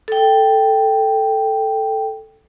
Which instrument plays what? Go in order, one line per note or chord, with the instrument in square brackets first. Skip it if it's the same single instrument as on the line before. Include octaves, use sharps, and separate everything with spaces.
[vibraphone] A4 G5